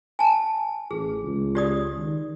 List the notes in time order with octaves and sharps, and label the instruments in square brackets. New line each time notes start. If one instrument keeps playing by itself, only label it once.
[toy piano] G#5 A5
[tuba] A1 [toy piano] G#4
[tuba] C#2
[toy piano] G4 D5 D#6
[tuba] D#3